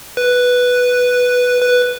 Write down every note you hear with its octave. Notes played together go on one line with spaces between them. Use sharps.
B4
B4